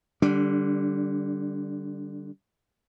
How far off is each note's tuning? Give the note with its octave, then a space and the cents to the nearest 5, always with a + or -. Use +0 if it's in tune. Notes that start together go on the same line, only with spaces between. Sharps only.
D3 +15 G3 +0 D4 -25